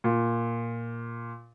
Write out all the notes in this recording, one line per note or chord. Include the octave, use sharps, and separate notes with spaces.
A#2